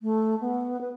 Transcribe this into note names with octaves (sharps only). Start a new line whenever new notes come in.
A3
B3
B4